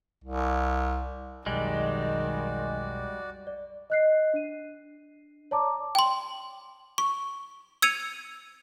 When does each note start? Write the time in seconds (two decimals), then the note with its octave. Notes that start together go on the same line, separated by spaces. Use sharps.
0.24 C2
1.46 B1 F2 D#3 G3 G#3 F#4 D5
3.47 D5
3.90 D#5 F#6 C7
4.34 D4 D#7
5.51 C#5 D5 A5 A#5 D6
5.95 G5 C6
6.98 C#6
7.82 E6 G#6 C#7 D#7 F7